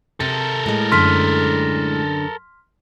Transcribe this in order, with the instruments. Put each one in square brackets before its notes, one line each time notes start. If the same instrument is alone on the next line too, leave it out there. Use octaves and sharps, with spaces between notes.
[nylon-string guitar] C3 [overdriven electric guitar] A4 A#4
[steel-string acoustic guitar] A2 G#3
[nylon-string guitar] F#2 D3 [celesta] C6 F6 B6